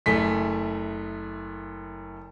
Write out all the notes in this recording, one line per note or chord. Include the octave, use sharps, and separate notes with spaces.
F#1 A3 G#4 B6